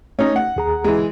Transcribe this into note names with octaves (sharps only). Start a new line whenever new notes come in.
A3 C#4 D#4
F#5
D#2 G#4 A#5
E3 G#3